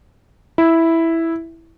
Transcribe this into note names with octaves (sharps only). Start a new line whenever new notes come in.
E4